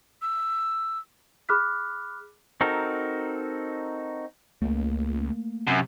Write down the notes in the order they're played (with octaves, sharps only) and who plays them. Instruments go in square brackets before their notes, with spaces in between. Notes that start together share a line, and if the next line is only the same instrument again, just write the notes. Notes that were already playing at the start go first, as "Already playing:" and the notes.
[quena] E6
[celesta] G#4 B5 D6 F6 F#6 B6
[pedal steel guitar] C4 D#4 F#4 A4 A#4
[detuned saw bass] C#2 [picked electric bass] A3 A#3
[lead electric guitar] F#2 [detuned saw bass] C3